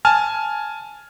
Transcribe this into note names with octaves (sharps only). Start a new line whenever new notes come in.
G#5 A5 F6